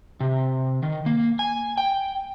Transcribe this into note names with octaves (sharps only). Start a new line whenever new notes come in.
C3
D#3
A#3
G#5
G5